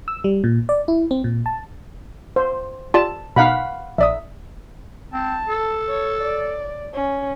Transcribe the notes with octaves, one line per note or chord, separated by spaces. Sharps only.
E6
G3
A#2
D5
E4
C4
A#2
A5
C5
F4 G4 D5 A5
B2 D#4 F5 F#5 B5
A#1 D5 E5 D#6
C4 A5
A4
C#5
D5
C#4